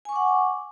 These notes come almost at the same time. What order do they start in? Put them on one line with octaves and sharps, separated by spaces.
G#5 C#6 D6 F#5